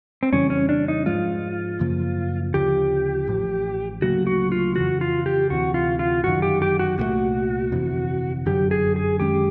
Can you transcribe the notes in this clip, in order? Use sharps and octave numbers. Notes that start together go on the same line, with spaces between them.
C4
F2 C#3 E3 G3 C#4
C#4
D4
D#4
G#2 F3 G#3 F4
F#2 C#3 F3 A#3
D2 C#3 F3 G4
A1 A2 F3
D2 C#3 F#3 A#3 F#4
F#4
F4
F2 C#3 E3 F#4
F4
G4
D2 C3 E3 F#4
F4
F4
G1 F#2 D#3 F#4
G4
G4
F#4
C2 A#2 F3 A3 F#4
G1 F2 C3 E3
G1 F#2 D3 F#3 G4
G#4
G#4
F#2 D#3 G#3 C#4 G4